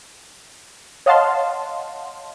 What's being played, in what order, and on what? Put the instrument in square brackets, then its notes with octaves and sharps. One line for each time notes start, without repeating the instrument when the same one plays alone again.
[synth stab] C#5 D#5 F5 F#5 A5 C6